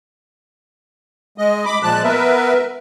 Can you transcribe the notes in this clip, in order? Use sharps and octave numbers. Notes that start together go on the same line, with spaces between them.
G#3 D#5
B5 D6
A#2 F3 G#3 A5 F#6
B3 A#4 B4 E5